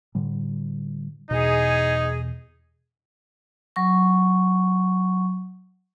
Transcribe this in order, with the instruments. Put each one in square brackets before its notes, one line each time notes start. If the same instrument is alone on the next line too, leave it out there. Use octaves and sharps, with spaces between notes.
[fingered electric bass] A2 D3 G3
[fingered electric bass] E2 B2 [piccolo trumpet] D#4 [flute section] G#4
[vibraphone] F#3 C#6